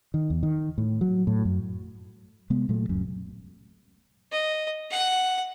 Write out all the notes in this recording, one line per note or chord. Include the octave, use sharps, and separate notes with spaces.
D#3
E2
D#3
A2
F#3
A2
F#2
C3 G#3 B3
A#2 F#3 A3
D1 C#2 F#2 C#4
D#5
F#5